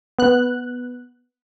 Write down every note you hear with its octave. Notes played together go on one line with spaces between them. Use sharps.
B3 F#6